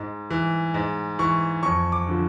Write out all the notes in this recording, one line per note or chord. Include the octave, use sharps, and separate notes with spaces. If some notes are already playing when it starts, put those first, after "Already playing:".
Already playing: G#2
E3
G#2
E3 C#6
F2 C#6
D6
D3 F3